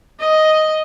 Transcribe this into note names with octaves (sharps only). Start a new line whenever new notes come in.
D#5